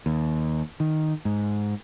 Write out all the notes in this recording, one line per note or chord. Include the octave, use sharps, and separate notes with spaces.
D#2
D#3
G#2